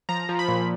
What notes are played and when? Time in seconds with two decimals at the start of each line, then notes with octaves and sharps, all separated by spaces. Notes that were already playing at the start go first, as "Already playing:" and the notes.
0.09 F3 A#5
0.29 F3
0.39 B5
0.48 A#2